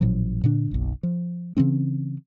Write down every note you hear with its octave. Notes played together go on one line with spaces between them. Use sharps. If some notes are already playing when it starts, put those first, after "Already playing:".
A1 A#2 F3 F#3
A#2 D3 D4
F#1 B1
F3
C#3 E3 C4 C#4